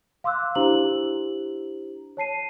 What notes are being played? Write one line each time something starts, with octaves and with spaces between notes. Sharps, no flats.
F5 C6 D6 E6 F#6
D4 E4 G4 C5 A#5 F#7
C#5 A5 C7 D#7